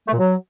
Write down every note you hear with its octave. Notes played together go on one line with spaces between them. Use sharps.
A3
A#2
F#3